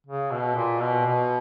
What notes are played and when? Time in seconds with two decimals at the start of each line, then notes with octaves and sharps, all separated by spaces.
0.06 C#3
0.31 B2
0.56 A#2
0.81 B2
1.06 B2